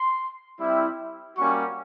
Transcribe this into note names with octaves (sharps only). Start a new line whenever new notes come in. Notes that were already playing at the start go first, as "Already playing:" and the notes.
Already playing: C6
G3 C4 E4
G3 A#3 C#4 F#4 C#6